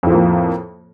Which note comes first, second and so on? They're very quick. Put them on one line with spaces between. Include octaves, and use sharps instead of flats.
F2 A2 F3 A#3